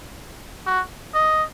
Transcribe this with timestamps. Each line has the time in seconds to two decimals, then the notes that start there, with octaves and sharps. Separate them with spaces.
0.67 F#4
1.15 D#5